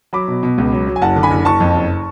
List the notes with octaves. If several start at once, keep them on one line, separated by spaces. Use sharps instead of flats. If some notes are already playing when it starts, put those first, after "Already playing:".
F#3 B5 D6
B2
B2
C#2
F#3
F#3
G#5
F#1 F#5 A5
D3
G#5 B5
F#1
F#1 A5 C#6
F2
F#1